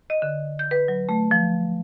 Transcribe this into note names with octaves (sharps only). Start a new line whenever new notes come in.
D#5
D3
G6
B4
F#3
A3
F3